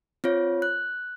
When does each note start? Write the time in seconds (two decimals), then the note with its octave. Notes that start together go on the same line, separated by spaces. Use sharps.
0.24 C4 F4 C#5
0.62 F#6